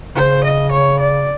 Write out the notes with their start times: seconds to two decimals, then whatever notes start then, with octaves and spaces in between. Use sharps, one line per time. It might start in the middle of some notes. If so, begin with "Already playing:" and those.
0.15 C#3 C5
0.44 D#5
0.72 C#5
0.99 D5